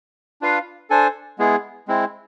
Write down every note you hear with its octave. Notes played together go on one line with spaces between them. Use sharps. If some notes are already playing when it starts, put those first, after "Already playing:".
D4 F4 B4 F5
D4 A4 C5 G#5
G#3 B3 E4 G#4
G#3 C4 E4